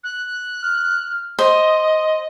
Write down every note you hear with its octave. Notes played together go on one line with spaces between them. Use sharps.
F#6
F6
C5 D#5 D#6